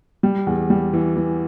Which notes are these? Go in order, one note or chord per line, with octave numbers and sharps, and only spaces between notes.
G3
E2
G3
E3
E3